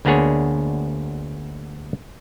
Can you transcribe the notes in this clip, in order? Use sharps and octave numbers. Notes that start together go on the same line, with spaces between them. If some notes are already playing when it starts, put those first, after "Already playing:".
D2 A#3 B3 D4 G#4 C#5